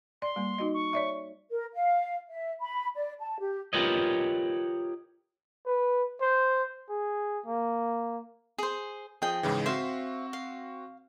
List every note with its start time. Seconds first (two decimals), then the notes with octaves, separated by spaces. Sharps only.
0.22 D5 C6
0.36 G3 A#3
0.58 D#4 F#4 D#5
0.74 C#6
0.93 C#5 D5 E5
1.50 A#4
1.73 F5
2.30 E5
2.61 B5
2.96 D5
3.20 A5
3.40 G4
3.73 F4 G4 A#4 B4 C#5 D#5
5.66 B4
6.21 C5
6.89 G#4
7.46 A#3
8.58 G#4 C5
9.22 F3 G#4 D#5 G5
9.43 G#2 C#3 E3
9.66 C4 F#4 C5 E5 F5
10.33 F5